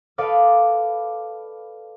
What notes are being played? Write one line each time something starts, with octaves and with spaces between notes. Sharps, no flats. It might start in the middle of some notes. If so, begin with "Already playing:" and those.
A4 B4 D5 D#5 F5